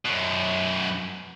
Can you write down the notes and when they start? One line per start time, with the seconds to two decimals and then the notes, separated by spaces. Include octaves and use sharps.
0.05 F#2 B2